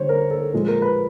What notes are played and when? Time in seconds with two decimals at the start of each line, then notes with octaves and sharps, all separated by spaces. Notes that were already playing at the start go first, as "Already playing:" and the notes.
Already playing: D3 G3 C5 C#5
0.09 A#4
0.31 A4
0.53 A#2 F3 G#3 A4
0.68 A#4
0.82 B4